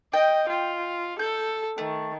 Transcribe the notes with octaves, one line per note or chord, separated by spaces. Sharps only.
D#5 G5
F4
A4 G6
D#3 A3